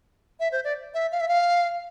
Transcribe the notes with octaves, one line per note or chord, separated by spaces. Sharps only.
E5
C5
D5
E5
F5
E5
F5